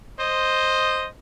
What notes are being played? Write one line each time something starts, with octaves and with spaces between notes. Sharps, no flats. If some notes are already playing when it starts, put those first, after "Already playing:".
C5 D#5